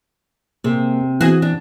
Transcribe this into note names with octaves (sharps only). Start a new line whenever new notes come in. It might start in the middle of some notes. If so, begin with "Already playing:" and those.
C3 A#3 G#4
E3 C4 F#4 G#4
D4